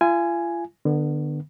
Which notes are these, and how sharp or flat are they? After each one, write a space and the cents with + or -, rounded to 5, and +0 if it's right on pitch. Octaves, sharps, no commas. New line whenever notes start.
F4 -40 G#5 +0
D3 +25 B3 -5